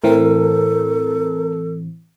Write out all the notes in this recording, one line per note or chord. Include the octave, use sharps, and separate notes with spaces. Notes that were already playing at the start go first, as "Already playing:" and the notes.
A2 E3 C4 A4 A#4